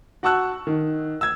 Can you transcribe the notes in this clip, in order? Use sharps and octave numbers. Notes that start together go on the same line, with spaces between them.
F#4 F#5 A5 C#6 E6 F#6
D#3
E6 G#6